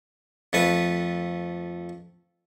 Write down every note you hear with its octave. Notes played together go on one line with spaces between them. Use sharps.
F2 A3 B4